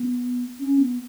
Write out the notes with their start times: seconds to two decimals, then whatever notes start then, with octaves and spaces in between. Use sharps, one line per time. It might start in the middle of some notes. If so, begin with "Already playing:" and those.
Already playing: B3
0.59 C#4
0.79 B3